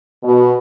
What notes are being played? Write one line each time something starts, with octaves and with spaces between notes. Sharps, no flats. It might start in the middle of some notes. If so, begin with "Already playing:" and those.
B2